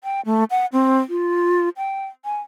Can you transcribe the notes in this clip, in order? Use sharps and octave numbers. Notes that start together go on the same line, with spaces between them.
G5
A3
F#5
C4
F4
G5
G#5